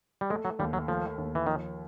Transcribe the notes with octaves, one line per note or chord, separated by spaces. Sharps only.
G3
G#3 A3
F#3
D#2 G3
F#3
F3 A3
D#2
E3
D#3 F3